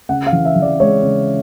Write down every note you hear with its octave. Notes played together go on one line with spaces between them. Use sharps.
C#3 F#5
F5
E3
E5
E3
D5
G#3 C#5
C#3